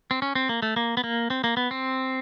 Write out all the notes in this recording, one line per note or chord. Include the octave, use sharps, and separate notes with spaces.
C4
C#4
C4
A#3
A3
A#3
B3
A#3
C4
A#3
B3
C4